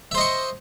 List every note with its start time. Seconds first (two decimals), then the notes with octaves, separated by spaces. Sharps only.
0.11 E5
0.14 C5
0.17 D#5
0.21 C#6